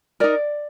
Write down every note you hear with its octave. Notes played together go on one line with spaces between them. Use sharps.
D#4 A#4 D5